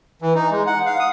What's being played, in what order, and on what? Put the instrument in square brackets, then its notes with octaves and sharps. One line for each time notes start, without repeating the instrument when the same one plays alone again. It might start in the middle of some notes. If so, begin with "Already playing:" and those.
[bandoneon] E3
D#4
G#3
F#5
F5
D#6